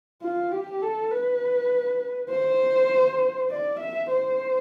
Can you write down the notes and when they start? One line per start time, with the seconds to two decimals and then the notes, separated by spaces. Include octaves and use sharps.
0.22 F4
0.52 G4
0.82 A4
1.11 B4
2.30 C5
3.51 D5
3.80 E5
4.10 C5